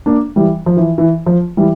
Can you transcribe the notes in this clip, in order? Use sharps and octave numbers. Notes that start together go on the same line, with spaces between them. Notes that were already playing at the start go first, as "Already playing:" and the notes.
A#3 D4
E3 G3
F3
E3
E3
F3
E3 G3